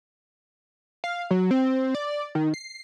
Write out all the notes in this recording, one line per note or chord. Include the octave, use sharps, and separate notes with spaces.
F5
F#3
C4
D5
D#3
C7